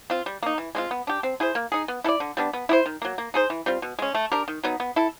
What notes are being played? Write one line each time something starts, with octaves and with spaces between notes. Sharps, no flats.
C4 F4
G3
A#3 D#4
E3
G#3 C4 F4
B3
D4 G4
C4
E4 G#4 C5
A#3
D#4 G#4
B3
E4 A4 D5
D3
G3 B3 D4
B3
E4 G#4 C5
D#3
F#3 A#3
A#3
D#4 G#4 C5
E3
G3 C4 F4
B2
G#3 C#4
A3
D4 G4 A#4
D#3
F#3 B3 D#4
B3
E4 A4